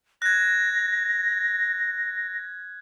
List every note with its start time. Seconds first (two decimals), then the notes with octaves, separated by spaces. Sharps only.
0.22 F#6 G#6 A#6